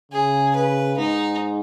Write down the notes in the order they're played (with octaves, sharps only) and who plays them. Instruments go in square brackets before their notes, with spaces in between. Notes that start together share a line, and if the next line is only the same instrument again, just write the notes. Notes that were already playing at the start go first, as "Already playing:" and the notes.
[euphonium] C#3 [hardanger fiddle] G#4
[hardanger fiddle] B4
[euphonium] G#2 [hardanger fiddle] D#4